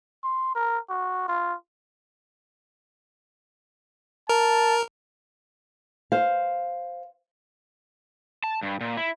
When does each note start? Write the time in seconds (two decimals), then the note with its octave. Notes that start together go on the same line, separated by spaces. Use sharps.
0.23 C6
0.55 A#4
0.89 F#4
1.28 F4
4.29 A#4 A5
6.12 C5 F5
8.44 A5
8.63 G2
8.81 A#2
8.97 E4